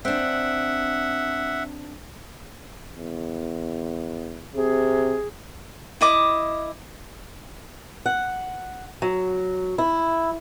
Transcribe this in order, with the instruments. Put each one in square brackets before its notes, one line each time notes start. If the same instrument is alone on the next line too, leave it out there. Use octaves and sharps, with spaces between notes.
[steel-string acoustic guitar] C4 D4 [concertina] E5 F#5
[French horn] E2
[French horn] C3 [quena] G#4
[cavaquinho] E4 D#5 D6
[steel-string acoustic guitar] F#5
F#3
E4